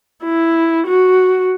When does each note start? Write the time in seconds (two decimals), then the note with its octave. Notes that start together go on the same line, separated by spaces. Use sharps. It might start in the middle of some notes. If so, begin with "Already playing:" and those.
0.23 E4
0.87 F#4